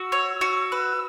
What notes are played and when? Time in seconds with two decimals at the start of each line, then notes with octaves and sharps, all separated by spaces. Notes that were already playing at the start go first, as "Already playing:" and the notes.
Already playing: F#4 E6
0.12 C#5
0.41 F#4
0.72 B4